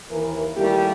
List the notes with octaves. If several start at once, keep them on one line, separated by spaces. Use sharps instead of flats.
D#2 E3 A#4
D#3 G3 A3 A#3 E4 G4